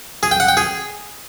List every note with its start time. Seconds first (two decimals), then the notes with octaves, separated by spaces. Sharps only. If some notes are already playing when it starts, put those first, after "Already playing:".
0.23 G#4
0.31 G5
0.40 F#5
0.48 G5
0.57 G#4